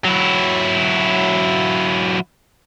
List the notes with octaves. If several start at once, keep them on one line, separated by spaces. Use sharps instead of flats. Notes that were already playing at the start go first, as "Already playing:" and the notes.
F#3 E4